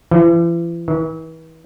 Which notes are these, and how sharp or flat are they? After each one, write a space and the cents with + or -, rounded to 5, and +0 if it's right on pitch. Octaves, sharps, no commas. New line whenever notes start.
E3 +40
E3 -40